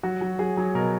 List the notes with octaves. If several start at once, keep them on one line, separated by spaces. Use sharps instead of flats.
F#3 F#4
F#3
F#3 G#4
F#3
B2 A#4